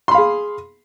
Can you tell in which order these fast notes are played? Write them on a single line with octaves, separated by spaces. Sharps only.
C6 B5 F5 G#4